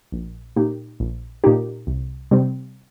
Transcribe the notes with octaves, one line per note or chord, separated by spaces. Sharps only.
A#1
A#2 A#3 D#4 G4
A#1
A#2 A#3 D#4 G4
C2
C3 G3 C4